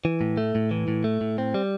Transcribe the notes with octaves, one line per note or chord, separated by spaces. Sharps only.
E3
A2
A3
A2
E3
A2
A3
A2
C4
G3